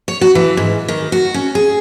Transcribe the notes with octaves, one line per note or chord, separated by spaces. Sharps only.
C#5
F#4
E3
G#2
D#3
F#4
C#4
G#4